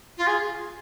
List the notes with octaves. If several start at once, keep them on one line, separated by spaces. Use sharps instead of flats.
F4
G#4